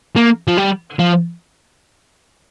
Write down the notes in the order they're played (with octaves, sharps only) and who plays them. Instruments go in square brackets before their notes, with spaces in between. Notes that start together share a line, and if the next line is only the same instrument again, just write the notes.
[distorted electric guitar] A#3
F3
G3
F3